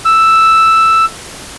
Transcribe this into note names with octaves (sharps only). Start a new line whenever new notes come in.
E6